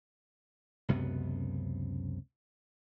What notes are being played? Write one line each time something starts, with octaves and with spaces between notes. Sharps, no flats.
C#2 F#2 C3 B3